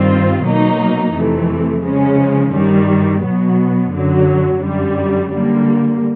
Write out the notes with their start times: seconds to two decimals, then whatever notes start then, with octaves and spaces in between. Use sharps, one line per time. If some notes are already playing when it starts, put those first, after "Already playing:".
Already playing: G2 D#3 G3 C4 F4
0.44 B2 F#3 A#3 D#4
1.14 F2 C3 E3 A3
1.84 C#3 F3 G#3 C#4
2.53 G2 D#3 G3
3.23 B2 F#3 B3
3.93 F#2 D3 F#3
4.63 F#2 D3 G3
5.32 D3 G3 A#3